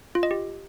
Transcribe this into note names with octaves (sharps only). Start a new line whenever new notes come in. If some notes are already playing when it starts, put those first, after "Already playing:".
F4
D#5
G4